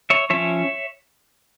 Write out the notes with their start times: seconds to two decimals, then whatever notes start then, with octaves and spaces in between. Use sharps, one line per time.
0.10 C#5 E5
0.30 F3 C#4 C#5 E5